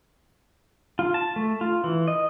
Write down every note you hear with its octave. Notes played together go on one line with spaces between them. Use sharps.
F4
A5
A3
F4
E3
D#5